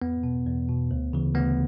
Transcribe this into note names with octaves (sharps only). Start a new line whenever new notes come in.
E2 B3
B2
E2
B2
D2
C#3 E3
D2 B3